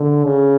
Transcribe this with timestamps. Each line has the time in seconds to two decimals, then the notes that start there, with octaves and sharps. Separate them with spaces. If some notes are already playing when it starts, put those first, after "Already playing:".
Already playing: D3
0.24 C#3